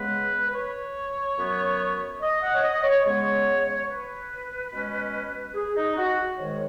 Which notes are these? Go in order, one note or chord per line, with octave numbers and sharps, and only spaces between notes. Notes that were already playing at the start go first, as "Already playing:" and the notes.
Already playing: C#3 G#3 B3 B4
B4
C#5
F#2 F#3 B3
D#5
F#5
C#5
D#5
C#5
C#3 G#3 B3 C#5
B4
B2 G#3 C#4
G#4
D#4
F#4
G#2 D#3 G#3 C#5